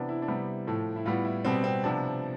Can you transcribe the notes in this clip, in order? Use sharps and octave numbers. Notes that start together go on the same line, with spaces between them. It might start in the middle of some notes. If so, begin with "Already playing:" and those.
Already playing: C3 E3 B3 D4
E4
D4
C3 G3 B3 E4
A2 F3 A3
E4
A2 G3 B3 F4
E4
B2 G3 B3 C4
C4
C3 F3 B3 D4